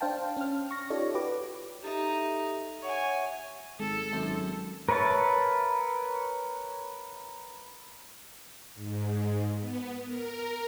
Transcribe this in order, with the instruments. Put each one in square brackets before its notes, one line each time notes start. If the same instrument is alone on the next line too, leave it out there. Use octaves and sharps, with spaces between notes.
[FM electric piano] D4 C5 F5 G5 A5
C#4 F6
C#6 A#6
D#4 F4 G4 A4 C#5 D5
F#4 G4 B4 D6
[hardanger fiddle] D#4 [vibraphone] G4 A4 E5
[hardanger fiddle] C#5 G#5 [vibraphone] E5 F#5 C#6
[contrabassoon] G#1 [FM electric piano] G#3 [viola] A4
[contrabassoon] G#1 [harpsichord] F#2 C5
[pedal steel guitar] A#4 B4 C#5 E5 A5
[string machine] G#2
B3
A#4